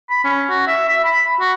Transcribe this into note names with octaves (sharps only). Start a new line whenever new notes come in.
B5
C#4
F#4
E5
E5
B5
F#4